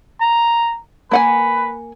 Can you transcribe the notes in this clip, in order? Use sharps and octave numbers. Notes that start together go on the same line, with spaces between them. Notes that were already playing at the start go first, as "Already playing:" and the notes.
A#5
A#3 B4 F#5 G#5